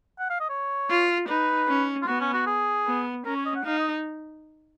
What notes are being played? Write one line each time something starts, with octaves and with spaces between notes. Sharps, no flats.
F#5
F5
D#5
C#5
F4
D#4 B4
C#4
F4
B3 F#4
C#4
F#4
G#4
B3
C#4 A#4
C#5
D#5
F#5
D#4 F5
D#5